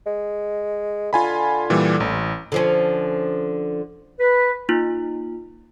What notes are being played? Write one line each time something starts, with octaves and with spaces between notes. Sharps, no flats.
G#3
D3 F4 G#5 B5
A#2 E3 G3
A1
D3 F3 C#4
B4
A#3 D#4 F4